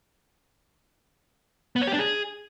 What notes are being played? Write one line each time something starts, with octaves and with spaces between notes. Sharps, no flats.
B3
C#5
G4
D4
G#4